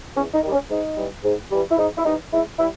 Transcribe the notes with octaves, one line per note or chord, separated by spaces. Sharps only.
E2 C#4
D#4
D#3 G3
C#4
G#2 D#4
E3 G3
G#2
E3 G3
E4
G#2 D#4
E4
E3 G3 D#4
G#2 E4
G3 E4